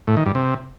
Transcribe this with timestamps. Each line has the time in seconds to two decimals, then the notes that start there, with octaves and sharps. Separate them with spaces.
0.08 A2
0.17 D#3
0.26 G2
0.35 C3